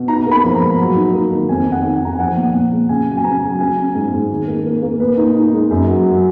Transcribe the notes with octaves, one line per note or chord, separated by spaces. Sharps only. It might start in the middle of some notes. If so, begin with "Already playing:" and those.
Already playing: B2
D#4 A#5
A#3
B5
F3
A#5
G#2
F#3
D#4
A#3
D#3
F2 G#5
F2
F#5
D#3
G#5
D#3 A#5
G#5
F3 F#5
A#2
A#2
G#3
C#3 G#5
F#3
G#5
C#4 A#5
F#3
C#4 G#5
C#4
G#2
G#2
D#3
A#3
A#3
A#3
A#2 B4
D#4
D#4
G#3
F#2
F#3
F#3